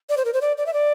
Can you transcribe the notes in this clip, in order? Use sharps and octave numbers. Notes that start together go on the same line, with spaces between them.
D5
C5
A#4
C5
D5
D5
E5
D5